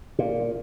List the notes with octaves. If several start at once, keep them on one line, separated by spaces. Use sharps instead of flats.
A#2